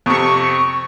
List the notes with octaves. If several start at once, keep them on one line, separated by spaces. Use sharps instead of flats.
F2 C3 C#6